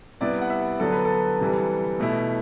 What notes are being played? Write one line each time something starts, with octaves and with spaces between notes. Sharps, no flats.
C3 G3 B3 E4 D5
F#5
E5
D3 F#3 B3 D4 A4
B4
A4
C3 E3 G3
B2 A3 E4